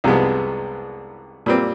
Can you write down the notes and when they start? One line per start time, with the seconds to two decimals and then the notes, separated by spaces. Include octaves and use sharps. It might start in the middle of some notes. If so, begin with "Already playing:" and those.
0.04 C2 C3 F3 G#3 B3
1.46 A#2 G3 C4